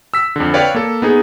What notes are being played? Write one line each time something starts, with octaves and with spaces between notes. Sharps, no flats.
E6 B6
F2 D3
B4 C#5 D5 F5 G5
A#3 A4
B3 D#4 G#4